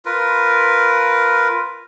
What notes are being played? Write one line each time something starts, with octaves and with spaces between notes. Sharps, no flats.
F4 A#4 B4